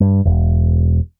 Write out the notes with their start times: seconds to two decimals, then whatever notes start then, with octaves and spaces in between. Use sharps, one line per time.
0.01 G2
0.25 E1